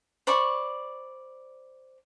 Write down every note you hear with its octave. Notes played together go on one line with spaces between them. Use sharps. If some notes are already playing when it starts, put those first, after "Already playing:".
C5 D5 B5 C#6